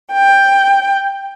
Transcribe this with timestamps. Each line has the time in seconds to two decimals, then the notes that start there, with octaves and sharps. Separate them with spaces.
0.12 G5